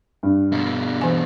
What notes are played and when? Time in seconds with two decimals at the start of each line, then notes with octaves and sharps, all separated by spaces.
0.23 G2
0.53 B2 D4
1.01 E3 G#5